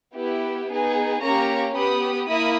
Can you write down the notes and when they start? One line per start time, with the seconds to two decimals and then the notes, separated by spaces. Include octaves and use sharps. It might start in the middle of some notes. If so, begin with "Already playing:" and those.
0.15 B3 E4 G4
0.68 B3 D#4 G#4
1.21 A#3 C#4 G4 A#5 C#6
1.74 B3 G4 B5 D#6
2.27 A#3 E4 B5 D#6